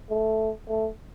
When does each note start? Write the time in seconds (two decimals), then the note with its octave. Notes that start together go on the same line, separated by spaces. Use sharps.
0.10 A3
0.68 A3